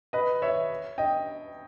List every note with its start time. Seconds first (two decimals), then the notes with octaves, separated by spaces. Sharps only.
0.13 B4 D#5
0.42 C#5 E5
0.98 D#5 G5